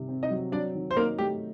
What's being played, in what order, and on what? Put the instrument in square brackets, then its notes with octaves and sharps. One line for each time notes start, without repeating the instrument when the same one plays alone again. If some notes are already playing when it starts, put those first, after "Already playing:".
Already playing: [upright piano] C3 D#3 G3
C4
[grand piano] D#4 D#5
[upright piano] F#3
[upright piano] F#3 [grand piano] D4 D5
[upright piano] D#3
[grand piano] C5
[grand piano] A#3 A#4 [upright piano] D#4
[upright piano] A3 [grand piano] G4